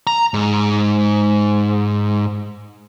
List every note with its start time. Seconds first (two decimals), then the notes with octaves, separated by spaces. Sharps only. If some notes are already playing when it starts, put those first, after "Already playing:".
0.07 A#5
0.34 G#2